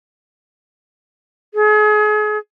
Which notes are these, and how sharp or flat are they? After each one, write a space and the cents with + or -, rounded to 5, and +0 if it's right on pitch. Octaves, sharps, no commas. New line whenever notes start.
G#4 +35